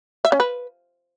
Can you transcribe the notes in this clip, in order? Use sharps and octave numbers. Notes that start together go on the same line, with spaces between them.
E5
C#4
B4